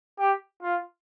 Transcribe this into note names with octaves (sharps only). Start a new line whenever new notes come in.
G4
F4